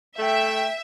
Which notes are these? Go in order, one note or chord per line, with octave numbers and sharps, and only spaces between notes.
A3 E5 G5